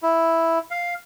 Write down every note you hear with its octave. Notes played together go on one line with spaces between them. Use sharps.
E4
F5